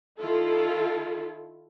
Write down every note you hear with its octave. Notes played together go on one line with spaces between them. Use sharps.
D#3 E4 F4 A4